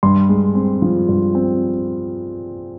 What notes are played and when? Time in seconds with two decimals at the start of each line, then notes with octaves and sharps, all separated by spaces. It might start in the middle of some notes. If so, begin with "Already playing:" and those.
0.03 G2 C6
0.29 G#3
0.55 C4
0.82 F3
1.09 G2
1.35 C4